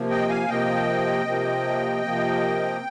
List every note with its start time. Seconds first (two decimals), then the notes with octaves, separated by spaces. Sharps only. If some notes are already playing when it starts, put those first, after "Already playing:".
Already playing: C3 F3 A#3
0.10 D#5 G5
0.29 F5 G#5
0.48 C3 F3 A#3 D#5 G5
1.26 C3 F3 A#3
2.03 C3 F3 A#3